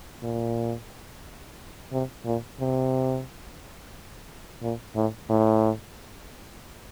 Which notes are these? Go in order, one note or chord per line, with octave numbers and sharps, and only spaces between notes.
A#2
C3
A#2
C3
A#2
A2
A2